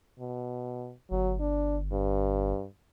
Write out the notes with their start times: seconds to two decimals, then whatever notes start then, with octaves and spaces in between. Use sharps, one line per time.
0.20 B2
1.11 G1 F#3
1.40 D4
1.93 G2